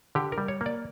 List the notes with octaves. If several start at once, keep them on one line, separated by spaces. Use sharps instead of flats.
D3 G4
A#4
G3
C#5
A#3
D5